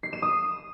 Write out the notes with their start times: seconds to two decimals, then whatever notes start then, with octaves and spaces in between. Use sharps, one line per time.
0.03 C7
0.13 E7
0.22 D#6